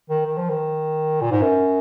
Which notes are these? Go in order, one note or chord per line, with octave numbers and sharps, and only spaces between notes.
D#3
D#3
F3
D#3
A#2
G#2
F#2